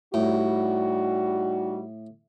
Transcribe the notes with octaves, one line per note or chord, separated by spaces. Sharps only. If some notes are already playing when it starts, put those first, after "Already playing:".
A2 G3 D#4 F#4